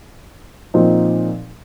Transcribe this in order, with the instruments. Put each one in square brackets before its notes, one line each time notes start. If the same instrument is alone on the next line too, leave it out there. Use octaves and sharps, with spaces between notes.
[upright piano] A#2 F3 C4 D#4